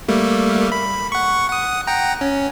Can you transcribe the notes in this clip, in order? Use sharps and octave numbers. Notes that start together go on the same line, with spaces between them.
G3 A3 A#3
B5
F#5 C#6
F#5 D#6
F#5 G5 A#5
C#4